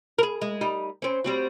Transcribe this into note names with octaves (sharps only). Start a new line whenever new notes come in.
G#4 A#4
G#3
G3 D#4
C4 C#4
G3 C4 F#4